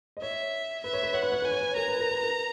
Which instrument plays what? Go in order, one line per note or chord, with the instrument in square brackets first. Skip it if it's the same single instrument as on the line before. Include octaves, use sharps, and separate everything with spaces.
[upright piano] D#5
[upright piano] C#5 [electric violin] E5
[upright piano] B4 [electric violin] E5
[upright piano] C#5
B4
[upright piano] C#5 [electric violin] F#5
[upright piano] B4
C#5
[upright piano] B4 [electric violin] G#5
[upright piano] C#5
B4
[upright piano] A#4 [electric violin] A#5
[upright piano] B4
A#4
B4
A#4